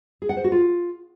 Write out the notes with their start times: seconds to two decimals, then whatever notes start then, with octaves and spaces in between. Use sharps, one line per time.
0.22 G#4
0.29 F#5
0.37 C5
0.44 F#4
0.52 F4